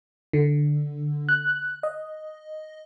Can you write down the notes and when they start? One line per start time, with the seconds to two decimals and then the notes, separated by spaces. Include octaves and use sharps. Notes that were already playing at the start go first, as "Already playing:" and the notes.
0.33 D3
1.29 F#6
1.83 D#5